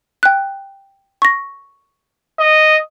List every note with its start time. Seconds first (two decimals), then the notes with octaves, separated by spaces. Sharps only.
0.23 G5 F#6
1.22 C#6 A#6
2.39 D#5